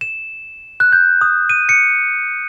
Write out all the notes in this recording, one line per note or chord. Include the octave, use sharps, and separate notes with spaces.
E7
F#6
G6
D#6
D#7
C#7